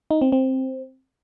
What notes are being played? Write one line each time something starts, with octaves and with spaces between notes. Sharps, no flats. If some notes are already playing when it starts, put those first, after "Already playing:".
D#4
C4
C4